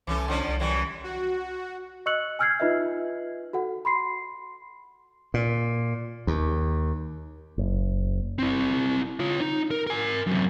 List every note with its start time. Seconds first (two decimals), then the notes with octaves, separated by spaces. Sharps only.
0.07 C2 E3 C#4 A4
0.28 D3 F3 C#4
0.48 C2
0.60 F#2 E3 G3
1.04 F#4
2.06 D#5 C#6 E6 F#6 C#7 F#7
2.39 G#5 E6 F6 G6 G#6 C7
2.60 D#4 F4 B4 D#5 E5
3.53 F#4 A4 F#5
3.85 B5 C6 C7
5.34 A#2
6.27 D#2
7.58 F#1
8.39 C4 E4
9.20 F4 C#5
9.41 D#4
9.71 A#4
9.87 A#4 G#5
10.27 F#2 C3